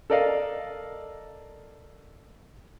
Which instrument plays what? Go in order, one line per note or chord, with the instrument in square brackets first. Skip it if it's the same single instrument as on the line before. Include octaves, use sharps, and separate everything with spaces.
[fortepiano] A4 A#4 D5 D#5 F5